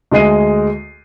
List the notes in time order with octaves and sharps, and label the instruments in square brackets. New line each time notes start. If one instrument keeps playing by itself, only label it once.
[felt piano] D2 G#3 D#5 C7 D#7